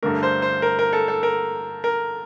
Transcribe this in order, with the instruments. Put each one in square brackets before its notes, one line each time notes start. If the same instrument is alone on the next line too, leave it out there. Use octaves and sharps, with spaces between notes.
[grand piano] G2 D3 A3 A#4
C5
C5
A#4
A#4
A4
A4
A#4
A#4